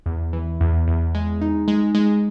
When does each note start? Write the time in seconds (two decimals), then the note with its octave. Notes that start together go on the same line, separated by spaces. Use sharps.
0.06 E2
0.33 E3
0.61 E2
0.88 E2
1.15 G#3
1.41 D#4
1.68 G#3
1.95 G#3